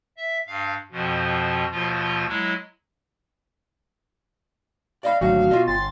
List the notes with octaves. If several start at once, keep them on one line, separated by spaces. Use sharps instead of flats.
E5
G2 F5
F2 B2 F3
D#2 B2 F3 F4
F#3 G#3 E4
D5 D#5 F5 B5
G#1 D2 F#3 F#4 F5
B2 F4 D#5
G1 C6 A6